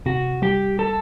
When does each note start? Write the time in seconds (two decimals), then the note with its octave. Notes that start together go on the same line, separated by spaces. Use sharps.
0.06 C3 F#4
0.42 G3 G4
0.79 A4